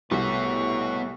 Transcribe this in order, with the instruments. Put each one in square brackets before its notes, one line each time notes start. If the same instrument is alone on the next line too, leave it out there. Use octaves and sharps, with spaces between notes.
[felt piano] C2 [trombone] A2 [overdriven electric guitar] B3 F#4 [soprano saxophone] C#6